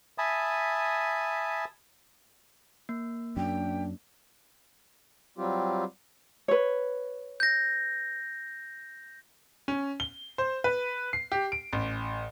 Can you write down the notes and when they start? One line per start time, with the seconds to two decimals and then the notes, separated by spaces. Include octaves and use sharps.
0.18 E5 G#5 A5 B5 D#6
2.89 A#3
3.37 F#2 D4 G5
5.38 F#3 G3 C4 F4 G4
6.48 B4 C#5
7.40 G6 A#6
9.68 C#4
10.00 G7
10.38 C5
10.64 B4
11.13 C7
11.32 G4
11.52 D7
11.73 A1